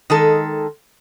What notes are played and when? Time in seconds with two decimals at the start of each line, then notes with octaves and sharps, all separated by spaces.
0.10 D#3 G#3 A4